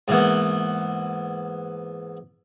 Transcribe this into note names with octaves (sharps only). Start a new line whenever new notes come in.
G#2 E3 A#3 B3